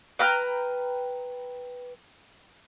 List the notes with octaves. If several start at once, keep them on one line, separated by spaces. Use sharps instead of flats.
B4 G5 A#5 F6